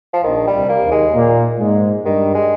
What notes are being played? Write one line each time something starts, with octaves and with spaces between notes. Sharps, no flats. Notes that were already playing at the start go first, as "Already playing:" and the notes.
F3
A#1 A#2 D#3
G3
C2 C3
A#3
D#2 D#3
G#3
A#2 A#3
G#2 G#3
G2 D#3 G3
G#3